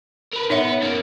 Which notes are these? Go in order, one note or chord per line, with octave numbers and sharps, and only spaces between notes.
A#4 B4
B3 D#4 C#5 E5
F#2 A#3